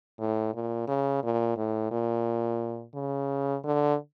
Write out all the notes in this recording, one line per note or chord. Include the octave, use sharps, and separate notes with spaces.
A2
A#2
C#3
A#2
A2
A#2
C#3
D3